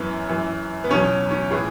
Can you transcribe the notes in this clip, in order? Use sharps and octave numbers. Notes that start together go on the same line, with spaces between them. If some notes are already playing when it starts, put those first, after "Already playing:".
Already playing: F#2 E3 B3
F#2 E3
B3
E2 B2 F#3 C#4
C#4
A2 E3 G#4